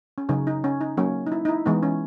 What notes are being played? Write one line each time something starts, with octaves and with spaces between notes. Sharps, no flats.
C#4
C#3 F#3 C#4 D#4
D#4
C#4
D#4
F#3 A#3 C#4
D#4
E4
D#4
E4
E3 G#3 B3 D#4
C#4